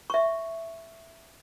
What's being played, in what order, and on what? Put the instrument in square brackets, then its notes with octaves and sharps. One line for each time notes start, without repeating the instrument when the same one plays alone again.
[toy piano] E5 C#6